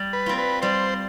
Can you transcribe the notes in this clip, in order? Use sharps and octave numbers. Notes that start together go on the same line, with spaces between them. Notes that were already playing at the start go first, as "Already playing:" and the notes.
Already playing: G3
B4
C4 F4
B4
G3 C5